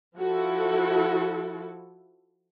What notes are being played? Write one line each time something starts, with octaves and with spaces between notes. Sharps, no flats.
F3 E4 F#4 A4